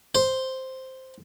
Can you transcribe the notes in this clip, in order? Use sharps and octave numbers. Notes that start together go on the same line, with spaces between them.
C5